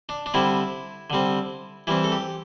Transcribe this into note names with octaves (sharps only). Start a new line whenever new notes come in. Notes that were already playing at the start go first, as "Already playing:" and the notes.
D4
D4
D3 G3 C4 E4
D3 G3 C4
E3 G3 C4 E4
A4
G4